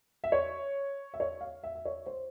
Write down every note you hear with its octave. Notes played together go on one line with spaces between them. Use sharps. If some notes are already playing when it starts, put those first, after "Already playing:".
E5
C#5
E5
C#5
F5
E5
E5
C#5
C5